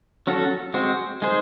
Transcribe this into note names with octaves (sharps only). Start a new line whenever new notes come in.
F#3 C#4 F#4 A4
G#3 C4 F#4 C5
G#3 D#4 G#4 C5